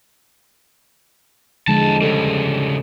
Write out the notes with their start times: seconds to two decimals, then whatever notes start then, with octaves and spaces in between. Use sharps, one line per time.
1.68 E2 D3 F3 G#3 A5
2.02 C#3 G3 A4